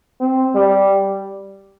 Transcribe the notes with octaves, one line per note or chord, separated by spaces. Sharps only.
C4
G3